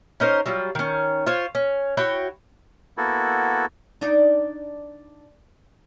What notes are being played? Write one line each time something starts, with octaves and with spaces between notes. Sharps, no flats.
C#4 D#4 A#4 C5
F#3 G3 F4
D#3 C#4
F4 C5 C#5
C#4
E4 F#4 C#5 G5
A#3 B3 E4 F#4 A4
D4 D#4 D5